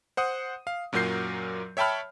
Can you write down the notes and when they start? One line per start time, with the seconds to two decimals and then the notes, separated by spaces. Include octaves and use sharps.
0.17 C5 F#5 D#6
0.67 F5
0.93 F#2 A#2 F#3 A#4 G6 C7
1.77 C#5 E5 G5 A5 B5 F6